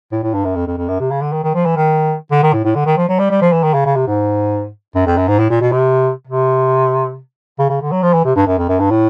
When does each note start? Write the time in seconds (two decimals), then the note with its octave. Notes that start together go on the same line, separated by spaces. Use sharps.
0.12 A2
0.23 A2
0.34 G2
0.45 F#2
0.55 F2
0.67 F2
0.77 F2
0.88 F#2
1.00 C3
1.11 C#3
1.22 D3
1.32 D#3
1.43 D#3
1.55 F3
1.65 E3
1.76 D#3
2.31 D3
2.43 D#3
2.53 A2
2.65 A2
2.75 D3
2.86 D#3
2.97 F3
3.08 F#3
3.19 G3
3.30 G3
3.42 F3
3.52 E3
3.63 D#3
3.74 C#3
3.86 C#3
3.96 C3
4.07 G#2
4.95 F#2
5.06 F2
5.17 F#2
5.28 G#2
5.39 A2
5.50 A#2
5.61 B2
5.72 C3
6.27 C3
7.59 C#3
7.70 C#3
7.81 D3
7.92 F#3
8.03 F3
8.13 E3
8.24 C3
8.35 G2
8.47 F#2
8.58 F2
8.69 F#2
8.80 G2
8.91 A2